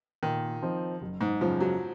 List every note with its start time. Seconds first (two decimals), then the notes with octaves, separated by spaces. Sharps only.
0.23 A#2 D#3
0.62 F3 C4 D#4
1.02 F#1
1.21 G#2
1.40 F#2 C#3 F3 G#3 C#4
1.60 F#3